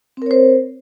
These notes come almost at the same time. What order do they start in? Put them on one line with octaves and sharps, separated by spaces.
C4 A#4 C#5 C5